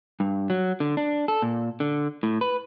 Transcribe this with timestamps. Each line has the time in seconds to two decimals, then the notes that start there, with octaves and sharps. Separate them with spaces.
0.20 G2
0.50 F#3
0.80 D3
0.97 D4
1.28 A4
1.42 A#2
1.80 D3
2.23 A2
2.41 B4